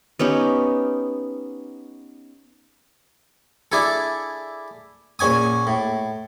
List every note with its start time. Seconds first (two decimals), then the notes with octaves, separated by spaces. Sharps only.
0.19 B3 C#4 D#4 G4
3.72 D4 E4 G#4 A4
5.19 A#1 C#4 G#5 D#6
5.67 A2